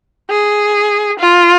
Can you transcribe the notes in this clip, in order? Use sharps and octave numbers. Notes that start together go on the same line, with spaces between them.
G#4
F4